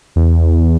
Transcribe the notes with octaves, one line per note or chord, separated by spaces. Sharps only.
E2